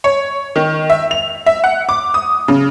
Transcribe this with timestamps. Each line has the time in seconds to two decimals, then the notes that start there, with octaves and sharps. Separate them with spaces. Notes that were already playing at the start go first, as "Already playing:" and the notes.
0.04 C#5
0.56 D#3
0.90 E5
1.11 F7
1.46 E5
1.64 F#5
1.89 D6
2.14 D#6
2.48 C#3